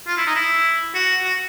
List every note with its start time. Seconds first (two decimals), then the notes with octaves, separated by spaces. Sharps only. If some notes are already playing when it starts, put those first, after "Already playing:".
0.07 F4
0.17 E4
0.26 D#4
0.35 E4
0.94 F#4
1.24 F#4